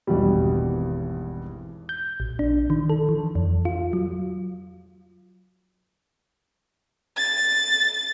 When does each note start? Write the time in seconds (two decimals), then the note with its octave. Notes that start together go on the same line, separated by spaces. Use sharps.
0.07 G#1 E2 G2 B2 G3
1.89 G6
2.20 A#1
2.39 D4
2.70 D#3
2.90 A4
3.09 E3
3.35 F2
3.65 F4
3.93 F#3
7.17 A6